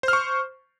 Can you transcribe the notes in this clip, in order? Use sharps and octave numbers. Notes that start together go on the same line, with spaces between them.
C5 C#6 F6